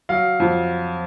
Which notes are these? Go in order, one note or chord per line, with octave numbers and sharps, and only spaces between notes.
F#3 F5
F2